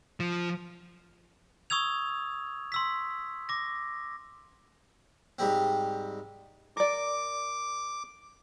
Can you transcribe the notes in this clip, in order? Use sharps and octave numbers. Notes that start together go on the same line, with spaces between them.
F3
C#6 D#6 E6 G#6 F7
C6 E6 B6
D6 A#6
G#2 G3 C4
A#4 D5 D6